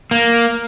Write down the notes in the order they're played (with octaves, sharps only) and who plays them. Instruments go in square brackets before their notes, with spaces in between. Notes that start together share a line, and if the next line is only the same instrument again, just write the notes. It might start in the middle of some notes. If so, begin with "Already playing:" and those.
[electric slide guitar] A#3